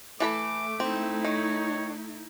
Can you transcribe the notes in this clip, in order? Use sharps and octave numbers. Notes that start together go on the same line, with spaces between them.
E3 A3 A4 B5 D6
C4 D#4 E4
D#3 C#5